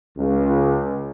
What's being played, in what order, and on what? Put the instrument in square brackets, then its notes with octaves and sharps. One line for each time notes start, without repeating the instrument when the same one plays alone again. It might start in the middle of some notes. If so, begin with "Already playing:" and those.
[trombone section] C#2